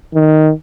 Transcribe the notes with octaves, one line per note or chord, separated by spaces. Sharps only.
D#3